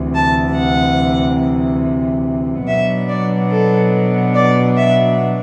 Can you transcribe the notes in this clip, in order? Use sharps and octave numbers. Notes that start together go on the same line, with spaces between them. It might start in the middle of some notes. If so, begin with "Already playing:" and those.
Already playing: D2 C3 E3
A5
F#5
B2 F#3 B3 D4 E5
D5
A4
D5
E5